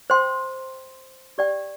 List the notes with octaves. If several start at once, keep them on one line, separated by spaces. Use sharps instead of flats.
C5 G5 C6
G4 D5 G5